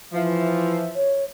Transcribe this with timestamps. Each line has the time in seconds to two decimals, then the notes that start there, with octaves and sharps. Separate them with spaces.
0.13 E3 F3 E5
0.95 C#5